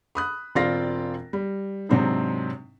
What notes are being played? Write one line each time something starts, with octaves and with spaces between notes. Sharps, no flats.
B5 D#6 F#6
E1 C4 F4 D5 F5 A#6
G3
G#2 C3 F#3 C4 D4 D#4